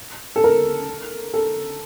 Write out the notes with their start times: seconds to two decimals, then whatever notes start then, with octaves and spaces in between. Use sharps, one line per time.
0.36 A4
0.44 A#4
1.34 A4